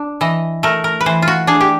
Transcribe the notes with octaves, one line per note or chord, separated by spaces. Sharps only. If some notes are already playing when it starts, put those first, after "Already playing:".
Already playing: D4
E3 D#5
A3 A#4
A#4
B4
E3 C5
F4
F#4
D4 G#4
G4